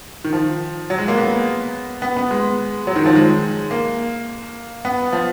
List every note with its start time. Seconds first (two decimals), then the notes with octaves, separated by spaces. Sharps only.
0.24 D#3
0.33 F3
0.90 F#3
0.98 G#3
1.08 A#3
1.18 B3
2.02 B3
2.17 B3
2.31 G#3
2.87 F#3
2.96 D#3
3.06 F3
3.15 G#3
3.71 A#3
4.85 B3
5.13 F3